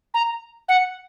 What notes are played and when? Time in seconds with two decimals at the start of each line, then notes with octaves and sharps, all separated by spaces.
0.14 A#5
0.69 F#5